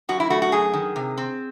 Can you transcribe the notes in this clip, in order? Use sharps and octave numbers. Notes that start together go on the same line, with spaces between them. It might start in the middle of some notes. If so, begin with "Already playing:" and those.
F#2 F#4
E4
A3 F#4
F#4
F#2 G#4
D#3
C3
C4